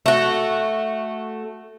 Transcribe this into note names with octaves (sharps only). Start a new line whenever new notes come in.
A3 F#4